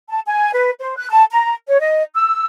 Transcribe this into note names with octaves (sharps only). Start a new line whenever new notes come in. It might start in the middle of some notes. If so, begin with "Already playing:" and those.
A5
G#5
B4
C5
F#6
A5
A#5
C#5
D#5
E6